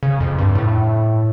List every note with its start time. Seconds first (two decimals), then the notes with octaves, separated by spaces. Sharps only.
0.03 C#3
0.20 F2
0.39 G2
0.55 A2